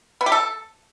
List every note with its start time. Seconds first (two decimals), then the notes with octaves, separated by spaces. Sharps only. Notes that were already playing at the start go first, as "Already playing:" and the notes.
0.21 B3
0.26 G4
0.32 A4